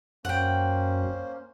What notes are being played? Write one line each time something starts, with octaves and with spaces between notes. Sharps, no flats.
F#2 A#3 C#4 C5 F#5 G5